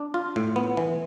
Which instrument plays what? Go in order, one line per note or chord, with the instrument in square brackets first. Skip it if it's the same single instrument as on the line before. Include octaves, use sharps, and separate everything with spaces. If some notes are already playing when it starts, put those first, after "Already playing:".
Already playing: [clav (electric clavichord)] D4
F4
A2
B3
E3